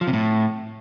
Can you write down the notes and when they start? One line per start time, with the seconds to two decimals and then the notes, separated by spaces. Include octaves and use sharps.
0.01 F3
0.07 C3
0.13 A2